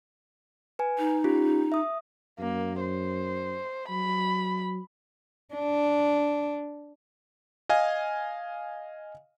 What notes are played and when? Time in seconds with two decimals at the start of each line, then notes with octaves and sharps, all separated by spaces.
0.79 B4 G#5
0.99 D#4
1.24 C#4 F4 G4
1.72 E5 D#6
2.39 F#2 A#3
2.81 C5
3.90 F#3 B5
5.54 D4
7.69 D#5 F5 G#5